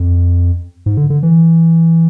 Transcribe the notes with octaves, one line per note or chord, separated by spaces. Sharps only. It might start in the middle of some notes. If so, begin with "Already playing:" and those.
Already playing: F2
G#2
D3
D3
E3